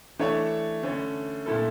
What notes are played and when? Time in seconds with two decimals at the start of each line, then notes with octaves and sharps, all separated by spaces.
0.19 E3 A3 D4 A4 C#5
0.83 D3 A3 C#4
1.46 A#2 A3 E4 A4